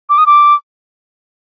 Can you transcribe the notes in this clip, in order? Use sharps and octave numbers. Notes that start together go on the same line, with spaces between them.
D6
D#6
D6